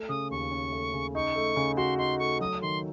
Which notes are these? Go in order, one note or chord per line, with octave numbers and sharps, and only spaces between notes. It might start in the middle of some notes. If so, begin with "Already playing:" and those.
Already playing: A3
C#3 D#6
D#2 C#6
C#4
A3
C#3
D#4 C#6
A3
C#3
F#4 C6
D#4 C6
A3 C#6
F#3 D#6
D#3 C6